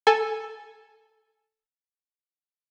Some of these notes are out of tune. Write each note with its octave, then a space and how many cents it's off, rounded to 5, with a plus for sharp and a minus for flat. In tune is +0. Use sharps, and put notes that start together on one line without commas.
A4 +0 G#5 +0